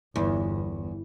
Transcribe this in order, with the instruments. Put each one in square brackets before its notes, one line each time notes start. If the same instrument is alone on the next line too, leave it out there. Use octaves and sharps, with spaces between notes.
[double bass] G1 [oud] E2